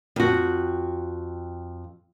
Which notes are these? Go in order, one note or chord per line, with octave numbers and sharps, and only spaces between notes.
F2 F#4